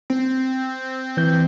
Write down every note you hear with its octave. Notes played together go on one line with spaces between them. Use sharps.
C4
E3 G6